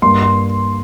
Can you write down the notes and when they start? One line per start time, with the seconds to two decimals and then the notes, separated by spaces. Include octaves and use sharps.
0.02 G2 G3 A#3 C6
0.22 C6